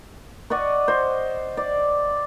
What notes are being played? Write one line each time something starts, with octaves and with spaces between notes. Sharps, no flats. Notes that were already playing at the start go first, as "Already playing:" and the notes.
D5 D#5 F#5 C#6
C5 D#5
D5